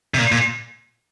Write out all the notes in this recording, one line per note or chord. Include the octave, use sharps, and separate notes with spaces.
C3
A#2
A#2